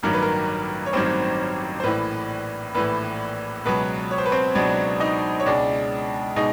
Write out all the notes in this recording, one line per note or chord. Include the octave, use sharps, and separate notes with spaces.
A1 G2 D#3 F#3 A#4
B4
A#4
C#5
A1 G2 D#3 F#3 C4 C5
C5
A#1 A2 E3 B4
A#1 A2 E3 B4
C#2 B2 F#3 B4
C#5
C5
B4
C4 C5
C#2 B2 F#3 D4 D5
D#4 D#5
C#5
C#2 B2 G#3 D4 D5
B2 G#3 D#4 D#5